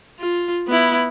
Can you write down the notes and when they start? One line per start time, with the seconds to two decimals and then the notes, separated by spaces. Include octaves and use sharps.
0.20 F4
0.68 B3 E4